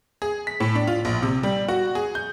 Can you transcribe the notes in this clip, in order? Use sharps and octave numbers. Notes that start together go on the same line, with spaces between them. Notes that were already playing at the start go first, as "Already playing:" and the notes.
G#4
B6
A2
D4
F4
A#1
C3
G3
F#4
G#4
G6